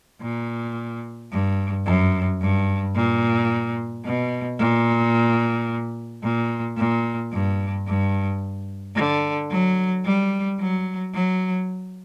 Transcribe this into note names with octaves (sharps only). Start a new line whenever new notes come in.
A#2
G2
F#2
G2
A#2
B2
A#2
A#2
A#2
G2
G2
D3
F#3
G3
F#3
F#3